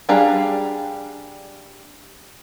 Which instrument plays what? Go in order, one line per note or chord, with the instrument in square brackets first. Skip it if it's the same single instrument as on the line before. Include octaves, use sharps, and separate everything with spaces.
[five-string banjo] G3 D4 G#4 F5 A#5